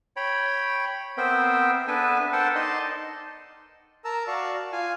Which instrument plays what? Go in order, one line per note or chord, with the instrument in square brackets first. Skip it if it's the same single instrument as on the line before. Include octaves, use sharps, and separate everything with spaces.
[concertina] C#5 G5 B5
B3 C4 A#4 C5 E5 G5
B3 D4 A4 B4 E5 G#5
A4 A#4 C5 F#5 G5 A5
D#4 D5 D#5 A5 C6
[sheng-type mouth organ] A#4 A5 A#5 E6
F#4 D5 F5 A5 C#6
F4 F5 G#5